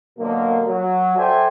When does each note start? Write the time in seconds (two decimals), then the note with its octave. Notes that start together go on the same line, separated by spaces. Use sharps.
0.19 B2 D3 F#3 A#3
0.66 F#3
1.17 A4 C5 D5 E5 G5 G#5